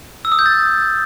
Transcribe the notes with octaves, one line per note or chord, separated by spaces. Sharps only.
E6
D#6
G6
A6